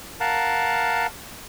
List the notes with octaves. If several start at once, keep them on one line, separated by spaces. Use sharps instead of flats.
A#4 F5 F#5 A5